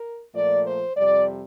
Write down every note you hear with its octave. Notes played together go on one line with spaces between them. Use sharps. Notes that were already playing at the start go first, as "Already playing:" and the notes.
Already playing: A#4
A#2 F3 A3 D5
C5
F2 C3 G3 D5